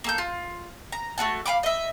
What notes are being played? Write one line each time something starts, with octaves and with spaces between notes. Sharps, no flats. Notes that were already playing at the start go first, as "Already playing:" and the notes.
A#3 A4 G6
F4
A#5
A3 C4 F#4 A5
F5 G5 B5 D6
D#5 E5